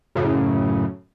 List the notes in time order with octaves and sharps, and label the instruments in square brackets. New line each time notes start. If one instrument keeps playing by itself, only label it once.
[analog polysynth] F#2 A2 C#3